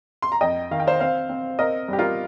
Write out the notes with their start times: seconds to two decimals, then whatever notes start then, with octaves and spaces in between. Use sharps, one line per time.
0.22 C6
0.32 A#5
0.41 F2 D#5 G5
0.71 D#3 F5
0.80 G5
0.87 C5 F5
1.00 C4 C5 F5
1.29 C4
1.59 C4 A#4 D#5
1.88 G2 G4
1.99 F4 A#4